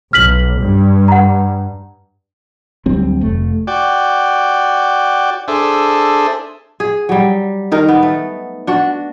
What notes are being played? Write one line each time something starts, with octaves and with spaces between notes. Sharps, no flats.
B1 F6 B6 F#7
G2
F#5 A#5
D2 F#3 G3 C4
F1 A3
F#4 D5 G5
D4 G#4 A4 C5 E5
G#4
F#3 G3
D#3 D#4 A#4
B3
A3
D4 F#4